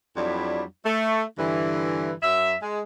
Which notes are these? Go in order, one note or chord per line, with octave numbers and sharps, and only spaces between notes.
F2 F#3 G3 D4 E4
A3
G2 D3 E3
F#2 F#3 E5
G#3